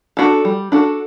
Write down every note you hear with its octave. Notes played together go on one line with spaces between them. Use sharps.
D4 F#4 A4
G3
D4 F#4 A4